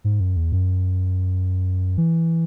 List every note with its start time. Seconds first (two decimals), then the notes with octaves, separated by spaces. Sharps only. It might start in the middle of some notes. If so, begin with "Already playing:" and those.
0.04 G#2
0.20 F#2
0.36 E2
0.52 F#2
1.97 E3